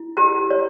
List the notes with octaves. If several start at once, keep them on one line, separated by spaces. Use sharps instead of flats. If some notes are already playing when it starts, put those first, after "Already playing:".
Already playing: E4
G4 A#5
C#5